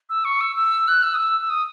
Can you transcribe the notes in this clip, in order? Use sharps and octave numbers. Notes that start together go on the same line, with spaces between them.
E6
C#6
E6
E6
F#6
E6
D#6
E6
E6
D#6